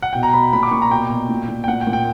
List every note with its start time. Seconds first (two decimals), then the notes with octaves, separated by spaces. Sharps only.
0.02 F#5
0.13 B2 G5
0.23 A#5
0.33 B2 B5
0.53 A#2 B5
0.63 D6
0.72 A#2 C#6
0.82 A#5
0.91 B2 G5
1.10 B2
1.29 A#2
1.49 A#2
1.64 G5
1.68 A#2 F#5
1.81 G5
1.87 A#2
1.93 G5